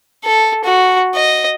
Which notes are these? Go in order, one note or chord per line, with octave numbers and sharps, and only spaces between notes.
A4
F#4
D#5